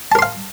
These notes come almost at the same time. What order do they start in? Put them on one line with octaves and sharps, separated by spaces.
A5 A#4 C6 F5